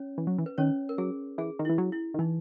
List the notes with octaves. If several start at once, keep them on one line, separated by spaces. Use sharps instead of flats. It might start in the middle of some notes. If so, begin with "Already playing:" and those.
Already playing: C#4 C#5
E3
F#3
E3
B4
D#3 C#4 C#5
A#4
F#3 G#4
E3 G#4
D#3
E3 E4
F#3
E4
D#3
E3 D#4